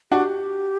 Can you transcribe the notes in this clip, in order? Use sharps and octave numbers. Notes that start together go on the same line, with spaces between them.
D4 F#4 G4